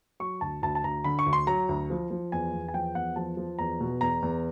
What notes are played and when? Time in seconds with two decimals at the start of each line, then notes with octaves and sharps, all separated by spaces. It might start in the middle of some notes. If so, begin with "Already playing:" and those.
0.20 F#3 C#6
0.41 D2 A5
0.62 D2 A5
0.75 A5
0.84 D2 A#5
1.04 D3 B5
1.19 C#6
1.26 D2
1.33 C6
1.47 F#3 A#5
1.69 D2
1.90 F3
2.10 F3
2.32 E2 G#5
2.53 E2
2.68 G#5
2.74 F3 G5
2.95 E2 F#5
3.16 F3 A5
3.37 F3
3.59 E2 A#5
3.80 B2
4.01 E2 A#5
4.22 E2